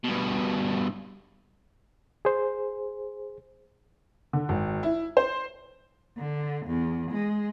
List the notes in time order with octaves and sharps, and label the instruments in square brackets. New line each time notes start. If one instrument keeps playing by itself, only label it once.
[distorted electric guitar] G2 B2
[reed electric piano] G#4 C5
[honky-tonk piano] D3
G#1
E4
C5
[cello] D3
E2
G#3